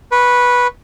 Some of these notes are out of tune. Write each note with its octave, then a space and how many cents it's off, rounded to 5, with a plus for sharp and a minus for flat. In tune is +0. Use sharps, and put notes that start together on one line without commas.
B4 -10 C#6 -10